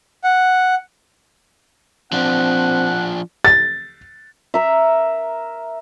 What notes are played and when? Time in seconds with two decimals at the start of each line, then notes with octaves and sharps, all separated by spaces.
0.24 F#5
2.13 F3 C4 D4 F#5
3.45 A6
4.54 A#4 E5